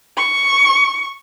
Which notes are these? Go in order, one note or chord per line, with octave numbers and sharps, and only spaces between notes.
C#6